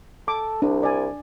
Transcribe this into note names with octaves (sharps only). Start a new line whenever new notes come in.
A4 D6
C2 D4
D5 G#5